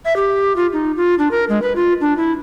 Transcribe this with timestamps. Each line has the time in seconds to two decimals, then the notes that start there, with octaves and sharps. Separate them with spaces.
0.05 E5
0.16 G4
0.56 F4
0.73 D#4
0.97 F4
1.19 D4
1.31 A#4
1.49 G#3
1.62 B4
1.76 F4
2.01 D4
2.17 E4